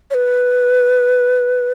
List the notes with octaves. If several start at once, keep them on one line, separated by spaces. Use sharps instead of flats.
C#5
B4